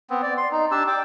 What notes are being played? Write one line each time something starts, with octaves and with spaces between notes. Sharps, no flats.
B3 C4
D5
C6
D#4
D4 G4 A5 E6
D5 G5 D6